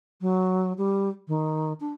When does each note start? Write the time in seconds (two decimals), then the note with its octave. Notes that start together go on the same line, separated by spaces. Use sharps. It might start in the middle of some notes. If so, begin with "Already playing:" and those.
0.21 F#3
0.78 G3
1.28 D#3
1.80 D4